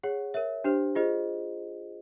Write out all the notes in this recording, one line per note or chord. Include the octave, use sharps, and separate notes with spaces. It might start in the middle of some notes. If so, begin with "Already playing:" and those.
G#4 C#5 F#5
A#4 C#5 E5
D4 G4 C5
F4 G#4 C5 D#5